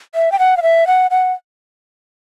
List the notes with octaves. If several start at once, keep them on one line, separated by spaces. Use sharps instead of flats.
E5
G5
F#5
F5
E5
F#5
F#5